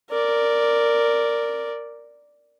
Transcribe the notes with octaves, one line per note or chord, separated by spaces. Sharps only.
A#4 D5